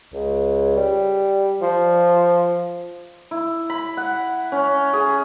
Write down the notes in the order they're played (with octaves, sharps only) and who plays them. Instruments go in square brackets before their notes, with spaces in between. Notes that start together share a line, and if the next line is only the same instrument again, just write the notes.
[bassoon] C#2
G3
F3
[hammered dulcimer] E4
B5
F#5
C#4
G#4